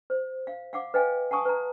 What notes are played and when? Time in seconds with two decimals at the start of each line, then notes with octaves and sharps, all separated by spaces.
0.10 C5
0.47 F5
0.73 F5 F#5 D6
0.94 B4 D#5 F5 G5 G#5
1.31 F#5 G#5 A5 C#6 D#6
1.45 B4 A#5